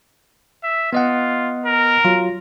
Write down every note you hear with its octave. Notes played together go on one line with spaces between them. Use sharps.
E5
B3 F4 D#5 F#5
A#4
F#3 F4